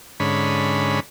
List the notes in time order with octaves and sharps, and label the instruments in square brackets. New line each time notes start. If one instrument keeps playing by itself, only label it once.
[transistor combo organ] G#2 D3 C#4 B5